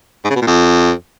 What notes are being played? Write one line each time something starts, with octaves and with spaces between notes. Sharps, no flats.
G#2
C#3
B2
A#2
F2